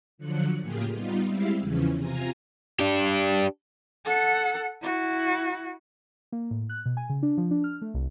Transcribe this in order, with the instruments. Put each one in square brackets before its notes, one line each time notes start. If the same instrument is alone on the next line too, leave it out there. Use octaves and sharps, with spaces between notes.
[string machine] D3 F3 F#3 F#6 C#7
A2 C#3 A#3 F4 G4 G#4
G3 B3 D#4 F4
G3 G#3 C4 E4 E5 F5
E2 C#3 E3 F3 C#4
C3 F4 G#5 A#5
[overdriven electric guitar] D4 G4
[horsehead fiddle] A4 F#5
E4 F#4
[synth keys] A#3
A2
F#6
B2
G#5
C#3
D4
F3
D4
F6
A3
C2